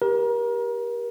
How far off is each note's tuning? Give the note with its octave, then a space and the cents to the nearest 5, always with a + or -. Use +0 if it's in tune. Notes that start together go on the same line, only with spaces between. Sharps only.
G4 +0 A#4 +30